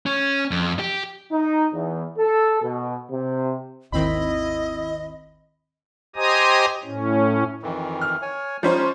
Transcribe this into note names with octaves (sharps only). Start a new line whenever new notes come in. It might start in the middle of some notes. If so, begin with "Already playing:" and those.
C#4
F2
G4
D#4
E2
A4
B2
C3
G#1 D#2 D#3 C4 E4 D#5 B5
G4 C5 D#5 G#5 A#5 D#6
A2 C#4
F2 D#3 E3
F6
C#5 G#5
F3 G3 G#3 C#4 D#4 C5